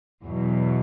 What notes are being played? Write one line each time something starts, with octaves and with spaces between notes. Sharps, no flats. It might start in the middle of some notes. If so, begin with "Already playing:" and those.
E2 B2 F#3